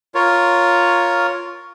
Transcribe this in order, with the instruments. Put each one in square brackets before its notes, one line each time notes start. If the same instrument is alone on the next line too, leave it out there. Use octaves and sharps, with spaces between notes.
[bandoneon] F4 A#4 C#5